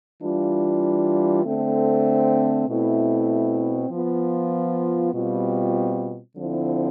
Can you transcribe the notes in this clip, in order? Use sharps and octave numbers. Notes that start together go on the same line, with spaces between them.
E3 G3 D4 F4
D3 A3 C4
B2 A3 C4 E4
F3 B3 F4
B2 G3 C4 F4
D3 F3 C4 E4